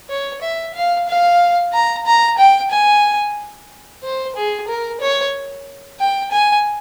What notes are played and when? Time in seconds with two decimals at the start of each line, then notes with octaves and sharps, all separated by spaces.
0.10 C#5
0.42 E5
0.75 F5
1.08 F5
1.73 A#5
2.06 A#5
2.38 G5
2.71 G#5
4.03 C5
4.36 G#4
4.68 A#4
5.01 C#5
6.00 G5
6.32 G#5